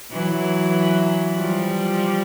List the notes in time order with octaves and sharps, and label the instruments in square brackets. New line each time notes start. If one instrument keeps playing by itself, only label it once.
[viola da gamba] E3 F#3
F3 G3